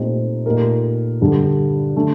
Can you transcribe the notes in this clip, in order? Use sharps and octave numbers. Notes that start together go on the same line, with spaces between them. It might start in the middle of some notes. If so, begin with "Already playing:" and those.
Already playing: A#2 A3 C4 D#4 G4
A#2 A3 D#4 G4 A#4
G2 D3 G3 D4 A4
D3 A3 D4